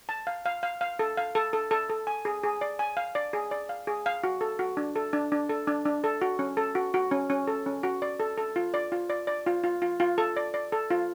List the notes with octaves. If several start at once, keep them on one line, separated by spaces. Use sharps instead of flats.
A5
F5
F5
F5
F5
A4
F5
A4
A4
A4
A4
G#5
G#4
G#4
D5
G#5
F5
D5
G#4
D5
F5
G#4
F5
F#4
A4
F#4
D4
A4
D4
D4
A4
D4
D4
A4
F#4
C#4
A4
F#4
F#4
C#4
C#4
A4
C#4
F#4
D5
A4
A4
F4
D5
F4
D5
D5
F4
F4
F4
F4
A4
D5
D5
A4
F4